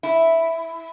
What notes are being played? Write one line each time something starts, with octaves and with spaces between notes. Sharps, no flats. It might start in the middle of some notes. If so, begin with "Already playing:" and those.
E4